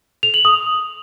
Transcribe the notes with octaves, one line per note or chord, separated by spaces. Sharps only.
F7
F#7
D#6